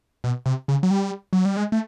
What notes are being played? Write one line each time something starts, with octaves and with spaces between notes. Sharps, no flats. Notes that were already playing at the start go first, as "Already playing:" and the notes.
B2
C3
C#3
F#3
G3
F#3
G3
G#3
A3